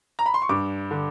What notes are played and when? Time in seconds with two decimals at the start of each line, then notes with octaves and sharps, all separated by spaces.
0.19 A#5
0.26 B5
0.34 C6
0.42 C#6
0.49 G2 D6
0.91 D3